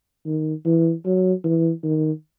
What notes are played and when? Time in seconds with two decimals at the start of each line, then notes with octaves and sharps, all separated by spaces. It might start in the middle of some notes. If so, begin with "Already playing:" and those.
0.26 D#3
0.65 E3
1.05 F#3
1.44 E3
1.84 D#3